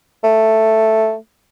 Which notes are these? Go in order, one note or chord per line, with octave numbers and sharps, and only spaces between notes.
A3